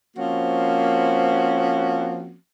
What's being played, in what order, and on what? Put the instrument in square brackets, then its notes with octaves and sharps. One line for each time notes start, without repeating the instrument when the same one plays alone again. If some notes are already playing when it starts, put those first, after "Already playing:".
[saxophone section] F3 A#3 C4 C#4 F#4